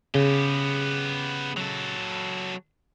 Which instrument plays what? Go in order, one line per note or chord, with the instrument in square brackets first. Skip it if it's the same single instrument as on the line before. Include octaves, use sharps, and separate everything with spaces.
[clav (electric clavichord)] C#3 [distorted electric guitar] B3 G4
[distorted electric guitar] F#3 A4